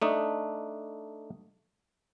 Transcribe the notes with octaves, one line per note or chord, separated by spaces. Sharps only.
A3 D4 D#4